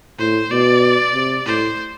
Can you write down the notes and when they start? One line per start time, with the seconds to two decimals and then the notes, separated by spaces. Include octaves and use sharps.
0.19 A2 C5
0.51 B2 D5
1.14 C3
1.46 A2 C5